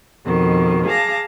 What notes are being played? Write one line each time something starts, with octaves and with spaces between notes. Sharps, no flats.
F2 B2 D#3
G#4 F5 A5 D6 A#6